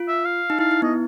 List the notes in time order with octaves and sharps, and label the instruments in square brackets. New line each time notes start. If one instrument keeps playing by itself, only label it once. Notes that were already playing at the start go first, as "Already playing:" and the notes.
Already playing: [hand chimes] F4
[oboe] E5
F5
[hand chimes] D#4
[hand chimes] E4 [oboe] F5
[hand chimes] E4
[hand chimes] B3 [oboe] D#5